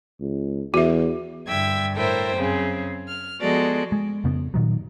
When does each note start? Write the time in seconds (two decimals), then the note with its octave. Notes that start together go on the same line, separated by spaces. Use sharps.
0.21 C#2
0.74 E2 F#4 E5
1.48 G2 D3 E5 G5 G#6
1.96 A2 E4 A4 A#4 C5 G5
2.35 F#2 C#3 C4 G#4
3.08 F6
3.41 F3 G#3 B3 F#4 A4 D5
3.92 G#3
4.24 F2 C#3 B3
4.54 A#2 D#3 F#3